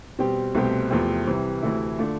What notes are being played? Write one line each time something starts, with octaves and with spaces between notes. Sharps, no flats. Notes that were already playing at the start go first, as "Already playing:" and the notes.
B2 G3 C4 G4
C2 B2 A3 C4 G4
E2 C3 F3 A3 C4
C2 C3 E3
D2 C3 E3 A3 E4
D3 A3 D4 F4